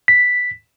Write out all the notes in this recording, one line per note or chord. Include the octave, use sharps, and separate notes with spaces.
B6